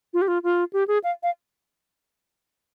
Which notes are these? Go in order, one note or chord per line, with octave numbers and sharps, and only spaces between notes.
F4
G4
F4
F4
G4
G#4
F5
F5